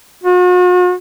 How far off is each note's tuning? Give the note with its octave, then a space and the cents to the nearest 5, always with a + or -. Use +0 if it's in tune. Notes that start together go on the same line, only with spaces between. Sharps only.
F#4 -45